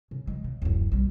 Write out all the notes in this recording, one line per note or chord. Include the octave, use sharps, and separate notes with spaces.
C#3
F3 G#3
C#3
D1 F#2
A#1 G3